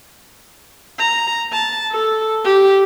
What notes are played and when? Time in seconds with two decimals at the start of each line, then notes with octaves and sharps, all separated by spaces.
0.99 A#5
1.53 A5
1.92 A4
2.45 G4